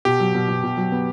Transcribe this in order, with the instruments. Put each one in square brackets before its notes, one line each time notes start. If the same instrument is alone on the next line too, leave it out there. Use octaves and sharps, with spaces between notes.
[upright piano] B2 [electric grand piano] G4
[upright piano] F#3
B2
B2
B2
F#3
B3